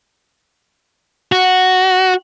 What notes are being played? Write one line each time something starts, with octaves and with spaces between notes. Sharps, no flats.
F#4